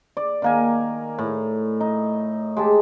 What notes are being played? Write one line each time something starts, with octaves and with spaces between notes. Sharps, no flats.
D5
D#3 A#3 G#5
A2
D#4
G#3 G4 A5